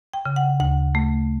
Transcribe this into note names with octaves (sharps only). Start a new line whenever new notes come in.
G5
C#3
F#5
D2 F#5
A3